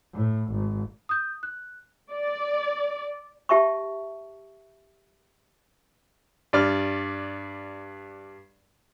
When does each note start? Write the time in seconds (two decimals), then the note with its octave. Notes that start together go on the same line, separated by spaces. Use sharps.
0.14 A2
0.52 G#1
1.09 D#6 G6
1.43 F#6
2.12 D5
3.49 G4 E5 A5 C#6
6.53 G2 D5 F6